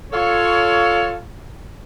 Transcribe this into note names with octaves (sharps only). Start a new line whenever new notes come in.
F4 A4 C#5